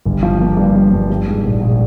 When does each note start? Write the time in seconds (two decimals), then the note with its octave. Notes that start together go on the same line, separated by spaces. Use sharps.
0.06 G1
0.23 F3
0.41 A#3
0.57 G2
0.75 G2
0.92 G2
1.10 G3
1.27 G#2
1.44 A#1
1.61 A#1